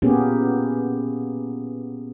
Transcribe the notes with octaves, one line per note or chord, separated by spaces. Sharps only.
A#2 A#3 B3 C#4 G4 G#4